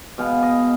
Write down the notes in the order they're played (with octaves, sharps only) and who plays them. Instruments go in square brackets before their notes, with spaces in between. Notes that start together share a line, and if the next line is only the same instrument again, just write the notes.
[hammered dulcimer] B2 G#3 B3 F5
D#5